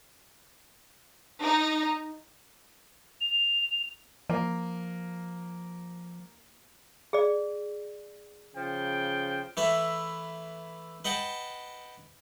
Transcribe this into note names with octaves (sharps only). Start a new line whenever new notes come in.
D#4
F7
F3 A#3
G#4 D5
C#3 F3 G5
E3 A3 B4 E5
B4 D#5 F#5 G5 A5